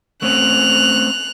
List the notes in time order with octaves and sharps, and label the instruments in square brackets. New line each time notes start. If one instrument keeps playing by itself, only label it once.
[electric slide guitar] A3 C4 C#4 [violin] F#6 F7